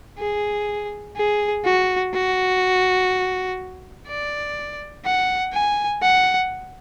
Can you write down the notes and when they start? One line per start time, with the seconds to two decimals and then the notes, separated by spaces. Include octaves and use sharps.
0.19 G#4
1.16 G#4
1.65 F#4
2.14 F#4
4.07 D5
5.05 F#5
5.53 G#5
6.02 F#5